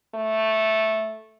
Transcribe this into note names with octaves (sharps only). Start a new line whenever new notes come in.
A3